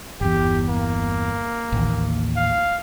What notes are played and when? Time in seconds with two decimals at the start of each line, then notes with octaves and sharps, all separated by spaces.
0.21 G1 E2 G4
0.69 A#3
1.72 A1 D#2
2.37 F5